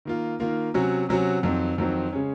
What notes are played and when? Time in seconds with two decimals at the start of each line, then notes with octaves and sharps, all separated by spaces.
0.05 D#3 A#3 F4
0.40 D#3 A#3 F4
0.74 C3 F#3 C#4 F#4
1.09 C3 F#3 C#4 F#4
1.43 F2 D#3 F#3 C4
1.78 F2 D#3 F#3 C4
2.13 C#3 G#3 C#4